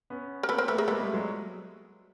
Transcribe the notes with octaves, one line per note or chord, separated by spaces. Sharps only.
B3 C#4
A#4
A#3 C4 A4 B4
A#4 C5
A3 B3 A4 B4
G#4 A#4
G#3 A#3 A4 B4
G3 A3
F#3 G#3